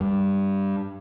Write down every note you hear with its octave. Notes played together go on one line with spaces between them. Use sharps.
G2